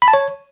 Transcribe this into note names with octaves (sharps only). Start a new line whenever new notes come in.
B5
A5
C#5